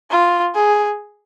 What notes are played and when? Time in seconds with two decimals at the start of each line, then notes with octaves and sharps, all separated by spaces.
0.10 F4
0.55 G#4